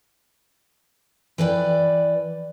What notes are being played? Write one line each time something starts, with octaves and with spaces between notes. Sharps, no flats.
E3 B4 D5 G5